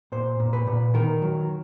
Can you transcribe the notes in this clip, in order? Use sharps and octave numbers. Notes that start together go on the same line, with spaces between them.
A#2 C5
A#2
B4
A#2
D#3 A#4
F#3